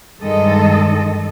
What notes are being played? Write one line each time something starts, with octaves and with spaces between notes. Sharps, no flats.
G2 D#3 G#3 A4 D#5